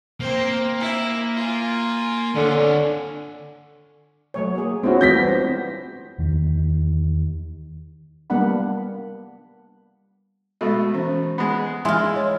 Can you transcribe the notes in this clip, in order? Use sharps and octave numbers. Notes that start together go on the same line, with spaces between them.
A#3 C4 C5
E4
F4 G#5
D3 D4 C#5
F#3 A3 C#5
A#3 G#4
G#3 C4 C#4 E4 F#4
E3 A3 F4 G6 A#6 B6
G3 B3 F#4
C4 D4 C5
E2 D#3
G3 A#3 B3 D4 F#5 B5
B2 G#3 A3 D#5
E3 C#4
G#3 B3
G#3 E4 F4 C6
C#5